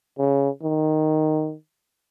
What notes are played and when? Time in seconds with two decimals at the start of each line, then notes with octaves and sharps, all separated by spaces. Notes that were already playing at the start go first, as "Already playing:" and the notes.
0.19 C#3
0.62 D#3